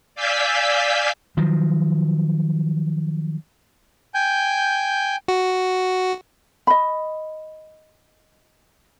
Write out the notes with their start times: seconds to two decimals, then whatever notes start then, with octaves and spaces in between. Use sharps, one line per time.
0.15 D5 F5 G#5 E6 G6 B6
1.37 D#3 F3 F#3
4.14 G5 G#5 G6
5.28 F#4
6.67 D#5 B5